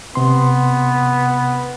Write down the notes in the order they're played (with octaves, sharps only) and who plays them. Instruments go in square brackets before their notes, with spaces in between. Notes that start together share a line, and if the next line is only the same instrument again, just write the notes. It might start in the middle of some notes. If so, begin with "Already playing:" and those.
[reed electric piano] C3 C6 [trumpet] B3